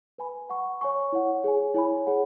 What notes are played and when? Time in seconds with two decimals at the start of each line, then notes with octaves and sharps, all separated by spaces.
0.18 B4 G#5 B5
0.50 B4 F#5 C#6
0.81 C#5 G#5 C#6
1.13 E4 C#5 F#5
1.44 G#4 C#5 G#5
1.74 E4 C#5 G#5 B5
2.06 G#4 C#5 F#5